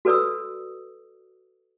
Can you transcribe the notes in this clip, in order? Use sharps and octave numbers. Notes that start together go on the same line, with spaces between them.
F#4 A4 B4 D5 D#6 E6